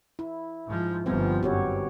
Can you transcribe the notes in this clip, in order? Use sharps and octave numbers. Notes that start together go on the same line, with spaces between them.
E4
G#2 F3
G1 F3 G3 B3 C4
G1 F#2 F#4 G4 C#5